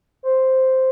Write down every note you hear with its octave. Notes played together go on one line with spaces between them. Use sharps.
C5